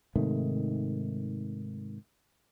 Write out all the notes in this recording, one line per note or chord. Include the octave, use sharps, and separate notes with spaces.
G#2 C3 D#3 A3